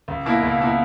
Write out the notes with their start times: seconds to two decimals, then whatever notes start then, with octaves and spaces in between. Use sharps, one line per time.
0.08 C#2
0.26 B2 A#3 E4
0.43 C#2
0.60 B2 A#3 E4